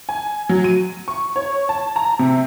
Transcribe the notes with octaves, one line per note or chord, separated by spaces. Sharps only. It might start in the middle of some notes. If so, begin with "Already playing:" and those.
G#5
F#3
D#7
C#6
C#5
A5
A#5
C3